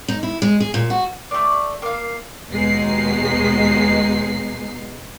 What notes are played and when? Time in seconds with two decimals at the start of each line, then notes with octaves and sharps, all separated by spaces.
0.08 D#4
0.23 E4
0.42 G#3
0.60 G#4
0.74 A#2
0.90 F#4
1.31 A3 D5
1.82 A#3 F5
2.50 D#2 B2 G#3 D#4 C7